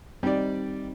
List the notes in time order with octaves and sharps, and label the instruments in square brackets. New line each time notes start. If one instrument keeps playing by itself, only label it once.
[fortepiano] G3 D5 [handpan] C4 D#4